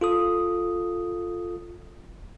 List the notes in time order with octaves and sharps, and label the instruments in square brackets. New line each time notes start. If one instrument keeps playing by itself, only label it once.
[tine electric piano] F4 A4 D#6